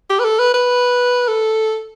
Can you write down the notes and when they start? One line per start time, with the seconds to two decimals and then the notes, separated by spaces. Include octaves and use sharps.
0.10 G4
0.19 B4
0.24 A4
0.39 B4
0.54 B4
1.28 A4